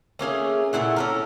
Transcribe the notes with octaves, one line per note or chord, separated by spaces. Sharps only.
A3 A#3 C#4 G#4
A#2 A3 E4 F#5
C#4 A4 A#4